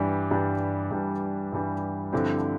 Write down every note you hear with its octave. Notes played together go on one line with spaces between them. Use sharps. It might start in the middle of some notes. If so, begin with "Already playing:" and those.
Already playing: G2 E3 G3 D4
G2 E3 G3 D4
G2 E3 G3 D4
G2 E3 G3 D4
G2 D3 F3 C4 E4